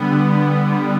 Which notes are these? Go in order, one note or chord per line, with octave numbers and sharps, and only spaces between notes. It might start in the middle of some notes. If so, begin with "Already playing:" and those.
Already playing: D3 G3 B3
D3
D3
B3
G3